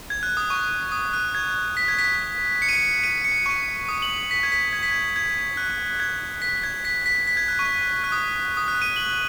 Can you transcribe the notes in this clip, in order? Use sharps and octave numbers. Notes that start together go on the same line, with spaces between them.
G#6
F#6
D#6
C#6
D#6
F#6
G#6
B6
G#6
B6
C#7
D#7
C#7
D#7
C#7
C#6
D#6
F#7
B6
G#6
B6
G#6
B6
G#6
G#6
F#6
G#6
B6
G#6
B6
B6
B6
G#6
F#6
C#6
F#6
D#6
D#6
F#6
D#7
F#7